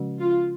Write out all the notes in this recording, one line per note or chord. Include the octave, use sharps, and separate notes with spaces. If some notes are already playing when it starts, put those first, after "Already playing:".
Already playing: C#3 F3 G#3 C#4 F#4
F4